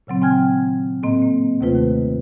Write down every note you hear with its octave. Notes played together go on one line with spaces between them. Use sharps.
A#2 C#3 F#3 C4
D#3 C4 G5 G#5 F6 G#6
A2 A#3 C4 D#5
A#3
D#2 A2 C3 A3 F4 B4
D#3